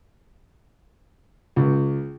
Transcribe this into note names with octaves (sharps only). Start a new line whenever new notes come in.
C#2